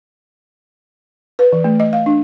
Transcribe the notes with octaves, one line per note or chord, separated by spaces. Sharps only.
B4
E3
A3
D#5
F5
D4